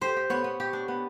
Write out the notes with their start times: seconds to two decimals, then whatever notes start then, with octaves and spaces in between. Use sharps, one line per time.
0.01 G4 C5
0.16 G4
0.30 B3 C#5
0.44 B3
0.60 G4
0.73 D4
0.88 B3